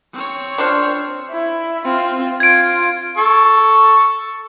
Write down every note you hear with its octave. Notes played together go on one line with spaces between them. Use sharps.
C4 C#5
D4 F4 C5
E4
C4 F4
F4 G#6 D7
A4 C#6